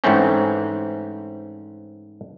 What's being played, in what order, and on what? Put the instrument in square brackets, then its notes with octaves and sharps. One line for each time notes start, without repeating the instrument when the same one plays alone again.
[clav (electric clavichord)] G#2 E3 A3 C4 C#4